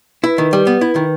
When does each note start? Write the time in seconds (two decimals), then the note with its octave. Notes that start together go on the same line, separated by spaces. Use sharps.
0.23 E4 B4
0.38 D#3
0.53 G3
0.67 B3
0.81 E4
0.96 D#3